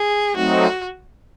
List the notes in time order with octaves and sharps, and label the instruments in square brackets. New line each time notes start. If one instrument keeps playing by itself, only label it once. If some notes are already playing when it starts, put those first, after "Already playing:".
Already playing: [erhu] G#4
[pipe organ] F#3 A3 C4 D#4 [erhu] F#4